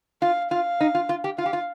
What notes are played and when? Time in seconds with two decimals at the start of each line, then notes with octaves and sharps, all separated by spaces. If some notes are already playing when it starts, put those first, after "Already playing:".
0.22 F4 F5
0.51 F4 F5
0.80 D#4
0.95 F4
1.09 F4
1.24 G4
1.38 F4 F5
1.46 G4
1.53 F4